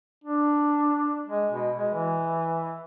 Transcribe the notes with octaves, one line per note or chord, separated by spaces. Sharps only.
D4
G#3
B2
G#3
E3